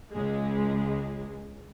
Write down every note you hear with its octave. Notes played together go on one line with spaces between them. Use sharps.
C#2 G#3